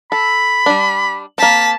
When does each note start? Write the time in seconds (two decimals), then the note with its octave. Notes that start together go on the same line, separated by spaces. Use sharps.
0.12 A4 B5
0.66 G3 D4
1.38 A#3 C4 A5 B6